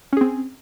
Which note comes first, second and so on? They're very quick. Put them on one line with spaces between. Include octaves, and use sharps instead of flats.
C#4 G#4 C4